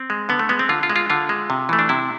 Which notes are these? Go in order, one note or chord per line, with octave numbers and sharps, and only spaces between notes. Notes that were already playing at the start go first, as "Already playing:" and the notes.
Already playing: C4
G#3
D3 B3
A3
G#3 B3
C4
D3 F4
F4
G#3
F4
D3 F4
G#3
C3
E3 A3
D4
C3 E4